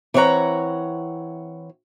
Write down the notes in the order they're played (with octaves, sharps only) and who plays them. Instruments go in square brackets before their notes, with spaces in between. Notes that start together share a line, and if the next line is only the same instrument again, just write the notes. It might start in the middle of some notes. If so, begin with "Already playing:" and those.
[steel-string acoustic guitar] E3 C4 C5 C#5 F#5 A#5